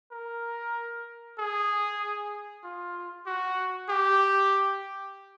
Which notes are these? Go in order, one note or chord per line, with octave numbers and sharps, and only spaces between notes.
A#4
G#4
F4
F#4
G4